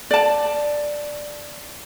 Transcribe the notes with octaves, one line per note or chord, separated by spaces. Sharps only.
D5 A5